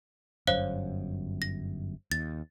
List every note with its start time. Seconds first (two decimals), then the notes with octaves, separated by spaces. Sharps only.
0.47 G1 F#2 C5 C#5 F5
1.42 A#6
2.12 D#2 A6